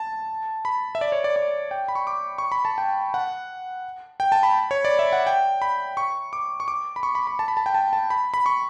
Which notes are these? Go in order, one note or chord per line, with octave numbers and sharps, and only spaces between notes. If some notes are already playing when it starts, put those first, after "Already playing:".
Already playing: A5
B5
E5
D5
C#5
D5
D5
G5
B5
C#6
D6
C#6
B5
A5
G5
F#5
G5
A5
B5
C#5
D5
E5
F#5
G5
B5
C#6
D6
C#6
D6
B5
C#6
B5
B5
A5
B5
A5
G5
A5
A5
B5
B5
C#6